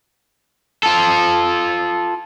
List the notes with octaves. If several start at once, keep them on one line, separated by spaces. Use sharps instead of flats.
F4 A4